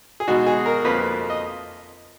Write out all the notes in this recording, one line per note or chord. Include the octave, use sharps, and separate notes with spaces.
G#4
B2 G#3 D#4 F#4
G#4
A#4
F2 F3 A#3 B4
D#5